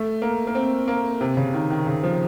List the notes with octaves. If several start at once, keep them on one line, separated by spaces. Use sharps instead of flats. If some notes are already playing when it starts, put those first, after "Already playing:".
Already playing: A3
A#3
A#3
C4
A#3
C3
C#3
D#3
D#3
C#3
F3